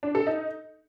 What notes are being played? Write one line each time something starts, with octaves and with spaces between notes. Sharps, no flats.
D4
A4
D#4